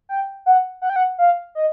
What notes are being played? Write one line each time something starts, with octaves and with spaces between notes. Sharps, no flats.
G5
F#5
F#5
G5
F#5
F5
D#5